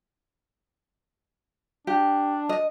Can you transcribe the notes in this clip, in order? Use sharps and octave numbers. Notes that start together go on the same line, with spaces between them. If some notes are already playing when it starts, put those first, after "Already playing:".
D4 G4
D#5